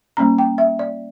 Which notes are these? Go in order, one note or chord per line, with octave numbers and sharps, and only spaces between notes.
G3 A#3 C#4 A#5
G5
E5
D5